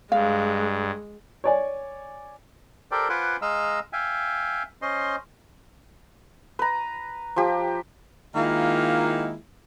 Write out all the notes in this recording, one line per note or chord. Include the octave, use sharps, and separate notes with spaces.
G2 G#3 F5
C#5 D5 G#5
G4 A4 A#4 C5 D5 G5
F4 B4 C5 F#5 G#5 D6
G#3 D#5 F5 A#5 E6
E5 F5 G5 G#5
C#4 C5 D#5 C6
B4 A#5
F3 G4
D#3 G#3 A#3 E4 F4